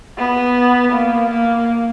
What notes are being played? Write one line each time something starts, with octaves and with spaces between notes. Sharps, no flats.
B3
A#3
A#3